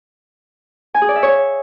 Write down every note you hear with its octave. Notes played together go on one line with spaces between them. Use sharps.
G#5
G#4
D5
E5
C#5